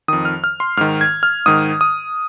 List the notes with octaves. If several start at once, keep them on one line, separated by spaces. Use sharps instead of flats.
F2 D#3 D#6
F6
F6
C6
G#2 D#3 F6
G#6
F6
G#2 D#3 D#6
D#6